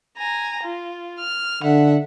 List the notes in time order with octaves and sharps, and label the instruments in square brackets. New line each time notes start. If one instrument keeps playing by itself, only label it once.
[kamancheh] G#5 A#5
F4
F6
[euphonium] D3 [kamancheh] E5 F#5